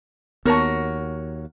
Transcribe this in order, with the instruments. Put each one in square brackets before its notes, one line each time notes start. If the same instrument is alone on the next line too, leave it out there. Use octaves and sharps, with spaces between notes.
[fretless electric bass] D#2 [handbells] B3 A5 [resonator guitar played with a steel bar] F#4 A#4 C#5